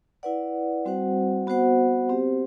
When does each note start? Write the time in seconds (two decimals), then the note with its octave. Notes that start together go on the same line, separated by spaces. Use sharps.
0.23 E4 B4 D5 F#5
0.85 G3 C4 F#4 C5 F#5
1.47 B3 F#4 C5 F#5
2.09 C4 G4 C5